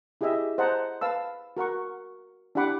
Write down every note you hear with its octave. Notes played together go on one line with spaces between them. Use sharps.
E4 G4 G#4 D#5 E5
C5 D#5 F#5 A5 A#5
B4 F5 A5 E6
F#4 A#4 F#5 C#6
D4 E4 G4 F#5 B5 D6